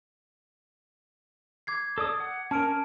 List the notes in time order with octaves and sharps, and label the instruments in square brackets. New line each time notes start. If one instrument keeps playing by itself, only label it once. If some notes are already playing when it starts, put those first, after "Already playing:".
[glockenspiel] D6 G#6 C7
[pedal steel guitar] A4 D5 D#6
F#5
[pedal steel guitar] C#4 A#4 [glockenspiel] A5 F6 D7